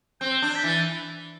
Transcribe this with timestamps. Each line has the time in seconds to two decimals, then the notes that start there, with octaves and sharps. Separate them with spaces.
0.20 C4 G6
0.42 D4 G6
0.55 B6
0.64 E3 A6